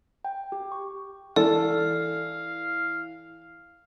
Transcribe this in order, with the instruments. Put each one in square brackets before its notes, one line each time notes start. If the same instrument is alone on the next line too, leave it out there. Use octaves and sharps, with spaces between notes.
[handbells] G5
G4
C#6
[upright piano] E3 [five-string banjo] A4 [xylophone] D5 [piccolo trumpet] F5